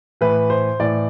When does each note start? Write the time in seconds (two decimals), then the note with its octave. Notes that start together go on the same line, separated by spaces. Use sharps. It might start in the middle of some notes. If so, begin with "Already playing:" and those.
0.21 A2 E3 B4
0.50 C5
0.79 A2 E3 D5